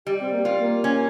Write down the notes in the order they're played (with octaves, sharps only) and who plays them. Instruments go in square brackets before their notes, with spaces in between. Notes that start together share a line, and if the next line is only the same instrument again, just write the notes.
[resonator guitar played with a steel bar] G3 [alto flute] G4
[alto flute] C4
A#3
[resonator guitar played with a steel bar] F4
[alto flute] A#3
[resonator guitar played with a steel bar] C#4